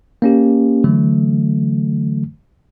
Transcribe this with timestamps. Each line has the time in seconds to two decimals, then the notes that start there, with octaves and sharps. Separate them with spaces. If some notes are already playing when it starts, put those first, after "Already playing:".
0.22 A#3 C#4 G4
0.84 D3 E3 F#3 A3